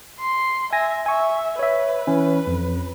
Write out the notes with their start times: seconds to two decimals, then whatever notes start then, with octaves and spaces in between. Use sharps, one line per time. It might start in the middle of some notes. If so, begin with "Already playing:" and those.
0.20 C6
0.73 E5 G#5 A#6
1.06 E5 G#5 C#6
1.59 B4 C#5 E5
2.07 E3 C#4
2.47 F2